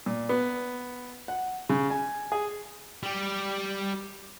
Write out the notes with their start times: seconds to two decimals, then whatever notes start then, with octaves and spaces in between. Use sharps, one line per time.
0.06 A#2
0.29 B3
1.28 F#5
1.69 C#3
1.90 G#5
2.32 G#4
3.03 G3 G4